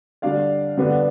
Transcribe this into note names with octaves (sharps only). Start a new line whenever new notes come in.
D3 G3 D4 D5 F5
D3 G3 B3 D4